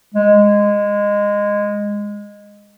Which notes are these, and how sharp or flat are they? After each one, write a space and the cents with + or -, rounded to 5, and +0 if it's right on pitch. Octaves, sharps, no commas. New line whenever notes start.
G#3 -15